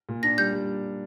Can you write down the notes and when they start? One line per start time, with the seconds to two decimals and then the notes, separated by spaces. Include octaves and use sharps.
0.09 A#2
0.23 D4 A#6
0.38 G3 G6
0.53 G3